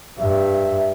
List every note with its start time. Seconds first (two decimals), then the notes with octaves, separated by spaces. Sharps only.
0.19 G2 E5